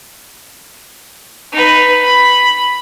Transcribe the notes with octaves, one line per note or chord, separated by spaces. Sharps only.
D#4 B4
B5